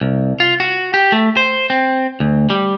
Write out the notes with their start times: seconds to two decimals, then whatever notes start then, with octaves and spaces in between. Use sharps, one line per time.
0.01 C2
0.40 F4
0.60 F#4
0.94 G4
1.12 A3
1.37 C5
1.70 C4
2.20 D2
2.50 G3